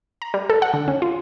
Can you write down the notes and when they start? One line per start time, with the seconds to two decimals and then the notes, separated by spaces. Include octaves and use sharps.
0.22 A#5
0.34 G3
0.50 A4
0.62 F#5
0.74 D3
0.88 C#4
1.02 F4